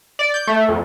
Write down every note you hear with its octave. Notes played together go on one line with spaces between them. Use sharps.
D5
G6
A3
F2